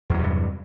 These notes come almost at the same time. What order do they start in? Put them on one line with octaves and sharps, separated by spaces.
E2 F#3 C3 G2